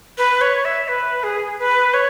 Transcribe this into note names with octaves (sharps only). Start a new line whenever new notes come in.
B4
C#5
E5
B4
G#4
B4
C#5